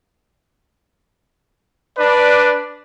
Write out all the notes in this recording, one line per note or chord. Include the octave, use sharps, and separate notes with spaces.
D4 B4 D5